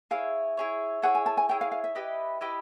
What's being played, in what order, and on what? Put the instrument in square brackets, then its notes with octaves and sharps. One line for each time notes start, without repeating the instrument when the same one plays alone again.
[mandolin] E4 G#4 C#5 [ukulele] F5
[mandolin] E4 G#4 C#5
[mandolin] E4 G#4 C#5 [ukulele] F#5
[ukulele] G#5
A5
G#5
[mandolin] E4 G#4 C#5 [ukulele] G5
[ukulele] F5
F5
E5
[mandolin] E4 G4 B4 D#5
E4 G4 B4 D#5